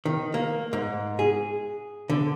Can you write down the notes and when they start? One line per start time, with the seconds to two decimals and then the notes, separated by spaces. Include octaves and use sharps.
0.06 D#3
0.34 A#3
0.73 G#2
1.19 G#4
2.10 D3